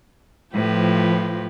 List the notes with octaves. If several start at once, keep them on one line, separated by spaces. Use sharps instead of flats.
A2 F3 G4 B4